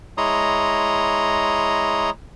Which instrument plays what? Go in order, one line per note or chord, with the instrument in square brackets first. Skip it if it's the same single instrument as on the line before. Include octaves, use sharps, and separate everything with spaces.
[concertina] G#3 E4 C#5 A#5 C6 D#6